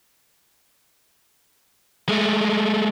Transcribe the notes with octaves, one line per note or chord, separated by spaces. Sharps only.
G#3 A3